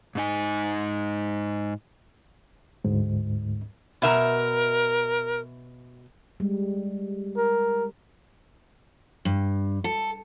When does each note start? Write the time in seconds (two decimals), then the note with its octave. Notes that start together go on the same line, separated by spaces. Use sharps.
0.15 G#2 D#4 G#5
2.85 D2 G#2
4.02 B2 A#4 E5 A#5
6.40 G3 G#3
7.37 A#4
9.25 G2
9.84 A4